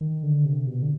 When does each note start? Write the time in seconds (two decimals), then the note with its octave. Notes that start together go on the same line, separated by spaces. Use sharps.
0.01 D#3
0.23 D3
0.45 C3
0.67 B2
0.82 D3